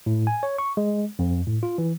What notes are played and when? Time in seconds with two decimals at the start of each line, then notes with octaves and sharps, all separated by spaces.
0.06 A2
0.27 G#5
0.43 C#5
0.58 C#6
0.77 G#3
1.19 F2
1.47 A2
1.63 F4
1.78 E3